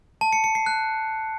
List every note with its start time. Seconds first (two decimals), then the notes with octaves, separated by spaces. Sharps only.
0.21 A5
0.33 C#7
0.44 C#7
0.55 C7
0.66 F#6